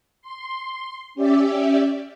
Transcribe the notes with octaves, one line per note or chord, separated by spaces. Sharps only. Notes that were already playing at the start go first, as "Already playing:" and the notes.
C6
C#4 G4 D5 E5